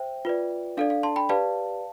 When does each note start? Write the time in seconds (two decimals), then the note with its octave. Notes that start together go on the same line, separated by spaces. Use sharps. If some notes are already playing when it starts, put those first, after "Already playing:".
Already playing: C5 E5 G5
0.25 F4 B4 D5
0.77 D4 A4 D5 F5
0.90 F5
1.03 A5 C6
1.16 G5 B5
1.29 G4 B4 D5 F5 A5